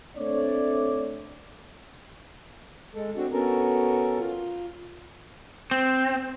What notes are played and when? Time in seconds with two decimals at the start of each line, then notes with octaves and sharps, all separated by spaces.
0.17 A3 C4 D4 C#5 D5
2.95 G#3 A4
3.17 C4 D4 F#4
3.32 B3 C#4 F#4 A4 A#4
4.19 F4
5.71 C4